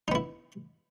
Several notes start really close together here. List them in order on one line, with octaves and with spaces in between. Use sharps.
D#4 B3 E4